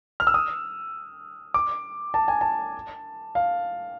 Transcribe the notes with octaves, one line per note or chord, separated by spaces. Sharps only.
F6
E6
D#6
D6
A5
G#5
A5
F5